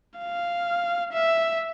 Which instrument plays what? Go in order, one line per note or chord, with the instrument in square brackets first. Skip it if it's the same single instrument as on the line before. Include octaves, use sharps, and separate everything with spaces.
[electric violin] F5
E5